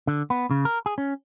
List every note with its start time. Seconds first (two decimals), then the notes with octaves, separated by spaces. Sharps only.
0.07 D3
0.30 B3
0.51 C#3
0.65 A#4
0.86 G#4
0.98 C#4